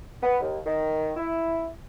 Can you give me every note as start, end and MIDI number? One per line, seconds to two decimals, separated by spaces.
0.23 0.36 59
0.41 0.57 39
0.66 1.11 51
1.16 1.68 64